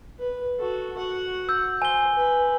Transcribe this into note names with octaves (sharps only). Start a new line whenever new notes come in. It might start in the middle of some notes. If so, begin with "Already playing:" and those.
B4
F#4 A4
F#4 F#5
E6 G6
C5 G#5 G7
B4